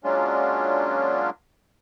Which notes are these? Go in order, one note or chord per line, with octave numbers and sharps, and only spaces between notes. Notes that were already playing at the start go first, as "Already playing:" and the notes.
F#3 G#3 A#3 C#4 D4 F4